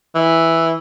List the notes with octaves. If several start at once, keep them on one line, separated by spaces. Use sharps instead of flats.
E3